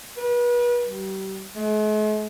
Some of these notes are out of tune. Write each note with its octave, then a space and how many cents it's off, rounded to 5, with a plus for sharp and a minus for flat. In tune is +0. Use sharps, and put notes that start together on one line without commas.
B4 -35
G3 -35
G#3 +45